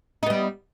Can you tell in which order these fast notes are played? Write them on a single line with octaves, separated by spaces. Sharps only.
D#4 B3 G3